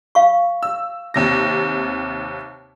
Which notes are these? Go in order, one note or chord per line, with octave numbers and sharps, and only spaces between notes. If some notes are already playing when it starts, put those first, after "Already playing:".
F5 C#6
E6
D#2 C3 A#6